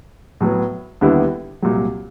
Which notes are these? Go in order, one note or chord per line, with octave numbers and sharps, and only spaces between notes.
A2 F#3 B3
D#2 D3 G3 B3 E4
C2 A#2 F#3